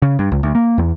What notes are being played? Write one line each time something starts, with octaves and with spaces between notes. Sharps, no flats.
C#3
G2
C#2
D2
A#3
E2